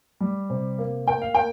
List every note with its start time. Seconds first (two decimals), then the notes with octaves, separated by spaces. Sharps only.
0.20 G3
0.50 C3
0.78 A#3
1.07 A#3 G5
1.22 F5
1.35 A#3 G5